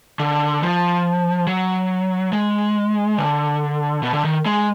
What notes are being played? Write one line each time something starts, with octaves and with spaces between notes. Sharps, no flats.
D3
F3
F#3
G#3
D3
B2
D3
D#3
G#3